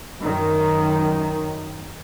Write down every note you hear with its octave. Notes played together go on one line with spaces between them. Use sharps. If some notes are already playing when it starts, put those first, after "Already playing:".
F#2 D#3